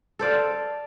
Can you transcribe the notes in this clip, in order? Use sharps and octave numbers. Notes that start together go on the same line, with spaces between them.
A4 C5 D5 F5